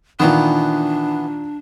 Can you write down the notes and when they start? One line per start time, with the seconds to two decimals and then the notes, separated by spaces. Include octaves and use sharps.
0.20 A#2 D#3 E3 B3 D4